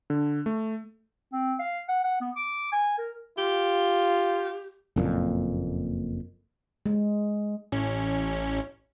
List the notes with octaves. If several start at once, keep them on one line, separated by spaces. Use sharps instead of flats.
D3
A3
C4
F5
F#5
F#5
B3
D6
G#5
A#4
F4 G4
F#1 F2 A#2
G#3
A1 C#4